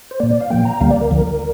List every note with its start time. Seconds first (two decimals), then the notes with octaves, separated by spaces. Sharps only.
0.11 C5
0.20 A#3 D5
0.23 A#2
0.30 D5
0.41 F5
0.50 A#2 F3 A#3 G5
0.65 A#5
0.80 D2 D3 G3 A#3 F5
0.91 D5
1.01 A#4
1.11 D2 D3 F3